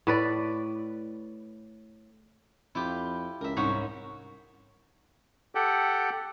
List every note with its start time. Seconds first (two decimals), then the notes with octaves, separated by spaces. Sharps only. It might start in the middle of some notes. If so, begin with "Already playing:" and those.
0.07 A2 B4 D5
2.75 F2 E4 F4 G4
3.41 C#2 A#4 E5
3.57 C2 G#2 C#4 F#4
5.55 G4 A4 F#5 G5